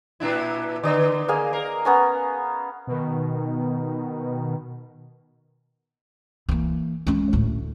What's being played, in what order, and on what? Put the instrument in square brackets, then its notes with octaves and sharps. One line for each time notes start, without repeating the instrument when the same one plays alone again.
[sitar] A#2 D4 E4
[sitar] D3 B3 [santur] D5 D#5
[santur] A#3 G#4 F5
[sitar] A#4 [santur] F5
[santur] B3 C#4 A#5
[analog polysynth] B2 D#3
[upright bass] E3 A#3
G#3 C#4
D2 A2